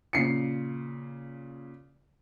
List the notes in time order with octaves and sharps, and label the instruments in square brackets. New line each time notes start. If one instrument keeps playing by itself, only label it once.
[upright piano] A#2 C#3 C7 C#7